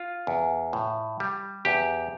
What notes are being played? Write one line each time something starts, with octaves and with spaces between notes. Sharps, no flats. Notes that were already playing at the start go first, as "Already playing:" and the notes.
Already playing: F4
E2
A2
G3
E2 G4